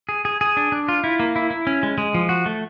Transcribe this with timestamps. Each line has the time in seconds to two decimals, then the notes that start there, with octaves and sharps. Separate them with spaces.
0.09 G#4
0.25 G#4
0.41 G#4
0.57 D4
0.72 D4
0.88 F4
1.04 E4
1.20 A#3
1.36 E4
1.50 E4
1.67 C#4
1.83 G#3
1.98 G#3
2.14 F3
2.29 F#4
2.46 A3